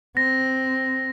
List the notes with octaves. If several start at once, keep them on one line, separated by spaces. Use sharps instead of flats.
C4 A#6